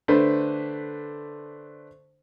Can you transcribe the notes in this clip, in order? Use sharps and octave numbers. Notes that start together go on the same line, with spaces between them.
D3 A3 D4 B4 C5